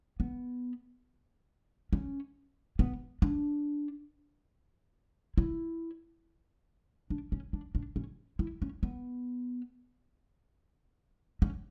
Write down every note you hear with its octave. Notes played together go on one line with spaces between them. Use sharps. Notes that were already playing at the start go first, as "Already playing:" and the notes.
B3
C#4
B3
D4
E4
D4
C#4
D4
D4
C#4
E4
C#4
B3
C#4